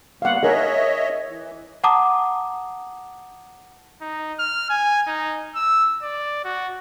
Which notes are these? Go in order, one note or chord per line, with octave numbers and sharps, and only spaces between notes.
G3 A#3 B3 F5 F#5
G#4 A#4 C#5 D#5 E5
E3
F#5 A5 A#5 D6 D#6
D#4
F6
G#5
D#4
E6
D5
F#4